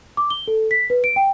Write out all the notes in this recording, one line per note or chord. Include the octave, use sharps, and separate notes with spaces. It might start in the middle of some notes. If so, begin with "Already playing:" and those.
D6
G7
A4
B6
B4
D7
G5